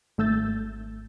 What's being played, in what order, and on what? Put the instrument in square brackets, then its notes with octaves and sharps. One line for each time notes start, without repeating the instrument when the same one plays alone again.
[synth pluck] G#1 A3 E6 G6 A6